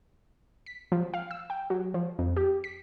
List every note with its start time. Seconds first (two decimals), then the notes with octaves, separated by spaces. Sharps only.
0.66 B6
0.92 F3
1.14 F5
1.31 E6
1.50 G5
1.70 F#3
1.94 F3
2.19 F2
2.37 G4
2.64 B6